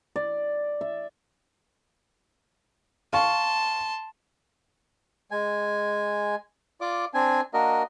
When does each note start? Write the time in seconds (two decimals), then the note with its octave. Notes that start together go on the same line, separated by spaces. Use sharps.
0.16 D5
0.81 E5
3.13 F5 A5 C6 C#6
5.31 G#3 G#5
6.81 F4 D5 D6
7.14 C4 D4 G#5
7.54 A#3 D4 F#4 A#4 D#5